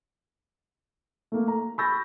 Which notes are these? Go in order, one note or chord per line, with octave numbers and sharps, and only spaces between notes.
A3 A#3
A#5
B5 C#6 E6 G6 A6 A#6